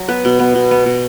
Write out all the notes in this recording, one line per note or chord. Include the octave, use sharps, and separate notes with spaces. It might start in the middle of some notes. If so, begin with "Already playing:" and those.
Already playing: F#3
B3 B4
B2
B3
B2
B3
B2